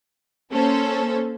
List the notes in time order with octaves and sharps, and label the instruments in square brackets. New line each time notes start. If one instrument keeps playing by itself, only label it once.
[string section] A#3 C#4 A4 C5